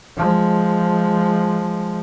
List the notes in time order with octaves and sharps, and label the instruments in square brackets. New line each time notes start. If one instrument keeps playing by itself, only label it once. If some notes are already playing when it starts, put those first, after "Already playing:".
[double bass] F3 G#3